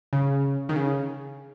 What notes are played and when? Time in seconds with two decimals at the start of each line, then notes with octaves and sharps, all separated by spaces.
0.13 C#3
0.69 D#3
0.76 C#3